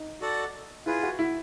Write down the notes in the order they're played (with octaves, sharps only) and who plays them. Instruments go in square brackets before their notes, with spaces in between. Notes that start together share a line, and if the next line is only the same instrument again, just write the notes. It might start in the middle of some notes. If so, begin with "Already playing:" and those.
Already playing: [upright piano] D#4
[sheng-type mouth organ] F#4 A4 D5 F#5 A5
[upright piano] E4 [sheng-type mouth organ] F4 G#4 B4
[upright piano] F#4
E4